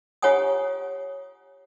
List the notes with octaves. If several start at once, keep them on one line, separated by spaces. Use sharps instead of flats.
F4 G4 C#5 F#5 G#5 D#6